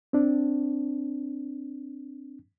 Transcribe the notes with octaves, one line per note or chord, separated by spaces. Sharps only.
C4 D4